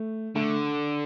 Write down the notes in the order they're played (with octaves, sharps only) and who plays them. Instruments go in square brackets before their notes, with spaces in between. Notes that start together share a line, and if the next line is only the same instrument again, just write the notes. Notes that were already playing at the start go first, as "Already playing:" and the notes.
Already playing: [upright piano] A3
[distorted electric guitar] D3 [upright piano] A3